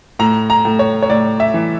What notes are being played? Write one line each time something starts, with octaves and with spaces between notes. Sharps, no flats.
A2 A#5
A#5
A2
C#5
C#5
A2 D5
E5
E3